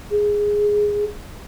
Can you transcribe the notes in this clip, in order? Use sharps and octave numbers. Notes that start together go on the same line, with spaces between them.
G#4